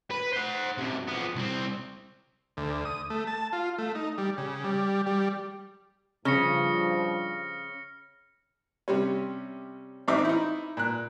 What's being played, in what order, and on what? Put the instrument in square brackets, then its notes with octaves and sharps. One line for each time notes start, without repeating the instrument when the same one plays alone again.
[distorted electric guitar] B4
C5 F#5
F#2 C3
F3 B3
C2 C4
[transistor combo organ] D2
D#6
A3
A5
F4
A3
D#4
G3
C#3
G3
G3
[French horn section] G2 F3 [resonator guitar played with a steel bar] C#3 [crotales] F6 A#6 C#7
[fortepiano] C3 G3 C#4
A1 C4 D#4 E5 D6
D#4 E4
A#2 F#6